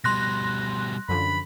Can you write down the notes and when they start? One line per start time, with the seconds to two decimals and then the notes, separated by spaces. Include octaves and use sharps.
0.04 B2 G3 C6 F#6 A#6
1.09 F#2 D3 F3 B5